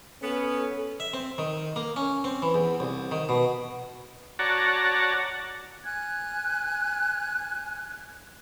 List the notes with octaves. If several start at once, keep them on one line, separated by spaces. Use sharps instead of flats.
B3 C#4 A4
E5
C4
D#3
A#3
C#4
C4
E3
E2
C2
D#3
B2
F#4 C#5 D5 F#5 A5 A#5
G#5 F6 F#6 G#6